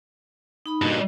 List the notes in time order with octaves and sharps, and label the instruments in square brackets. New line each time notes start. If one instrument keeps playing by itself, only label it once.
[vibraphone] D#4 B5 D#6
[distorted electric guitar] G2 A#2 [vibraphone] F#4 D#5